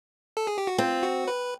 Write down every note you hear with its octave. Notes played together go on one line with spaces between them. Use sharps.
A4
G#4
G4
F#4
C4 F4
F#4
B4